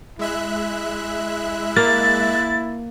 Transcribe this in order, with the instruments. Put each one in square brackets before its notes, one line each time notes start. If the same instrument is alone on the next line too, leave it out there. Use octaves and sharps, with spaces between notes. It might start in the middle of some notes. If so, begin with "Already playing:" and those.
[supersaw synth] G#3 E5 F#6 [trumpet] E4
[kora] A#3 [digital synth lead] A6